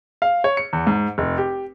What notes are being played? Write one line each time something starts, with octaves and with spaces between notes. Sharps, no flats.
F5
C#5
C#7
E2
G#2
F1
G4